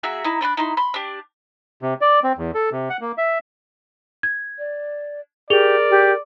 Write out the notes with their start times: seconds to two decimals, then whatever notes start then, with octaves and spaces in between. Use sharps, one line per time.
0.03 A#3 F#4 G#4 E5
0.24 D#4 E4
0.41 D4 B5 C6 F#6
0.57 D#4 E4 C6
0.77 B5 C6
0.94 D4 G4
1.82 C3
2.01 D5
2.24 C4
2.38 E2
2.55 A4
2.72 C3
2.90 F#5
3.01 A#3
3.18 E5
4.23 G#6
4.59 D5
5.50 G4 G#4 A#4 D5 F7 G7
5.90 G4